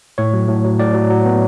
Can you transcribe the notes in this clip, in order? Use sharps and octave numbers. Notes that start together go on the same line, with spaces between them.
A2 C#5
F#3
A2
F#3
A2 D5
F#3
F#3
B3